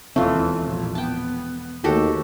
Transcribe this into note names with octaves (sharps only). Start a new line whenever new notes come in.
E1 D#2 E3 A3 C4 F4
A#1 A#2
B3 G5 A5
D#2 D#3 A3 F#4 G4 A4